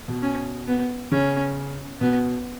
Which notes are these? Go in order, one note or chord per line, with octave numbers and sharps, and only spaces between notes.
B2
C#4
B3
C#3 C#4
B2 B3